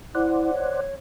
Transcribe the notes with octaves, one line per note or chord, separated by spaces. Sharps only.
E4 C5 D5 F#5
C#5